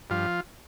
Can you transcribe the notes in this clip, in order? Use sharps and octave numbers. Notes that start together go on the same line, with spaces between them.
G2 F3 F4